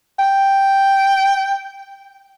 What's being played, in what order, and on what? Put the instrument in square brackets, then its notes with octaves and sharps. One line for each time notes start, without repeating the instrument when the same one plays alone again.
[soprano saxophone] G5